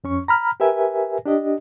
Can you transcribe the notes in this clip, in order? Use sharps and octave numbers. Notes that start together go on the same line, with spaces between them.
F2 C#4 C#6
A#5 B5 F6
G4 A#4 B4 E5 G#5
D4 G4 D#5